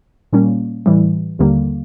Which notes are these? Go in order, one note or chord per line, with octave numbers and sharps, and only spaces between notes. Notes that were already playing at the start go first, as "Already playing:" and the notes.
A#2 G3 A#3 C#4
A2 E3 G3
D#2 D3 G3 A#3